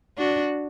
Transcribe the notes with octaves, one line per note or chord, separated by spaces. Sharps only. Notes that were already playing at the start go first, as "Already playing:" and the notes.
D4 F#4